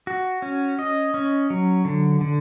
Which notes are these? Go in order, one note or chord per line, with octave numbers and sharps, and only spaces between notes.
F#4
C#4
D#5
C#4
F#3
D3
D3